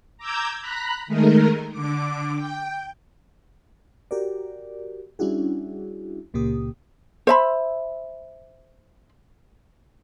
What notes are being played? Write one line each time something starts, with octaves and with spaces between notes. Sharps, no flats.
A#5 D6 E6 G6 G#6
A#5 B5 F#6
D#3 G#3 A3 D#4 A#4
D3 D6
G5
F#4 G4 A#4 D5
G3 C#4 D4 E4 F#4 G#4
C#2 A#2 C#3 A#3 G4 D#6
C5 E5 B5